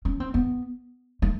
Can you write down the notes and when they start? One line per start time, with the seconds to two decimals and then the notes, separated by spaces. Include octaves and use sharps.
0.05 C#4
0.20 C4
0.34 B3
1.22 A3